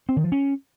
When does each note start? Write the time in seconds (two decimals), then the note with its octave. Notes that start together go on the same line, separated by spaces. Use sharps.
0.09 C4
0.16 D#3
0.24 F3
0.32 C#4